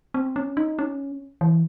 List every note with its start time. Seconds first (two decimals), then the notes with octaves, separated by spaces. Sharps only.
0.14 C4
0.36 C#4
0.57 D#4
0.79 C#4
1.41 E3